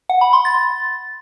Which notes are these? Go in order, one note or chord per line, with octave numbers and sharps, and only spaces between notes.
F#5
B5
C6
A6